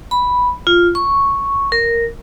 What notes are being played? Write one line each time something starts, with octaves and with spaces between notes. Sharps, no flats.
B5
F4
C#6
A#4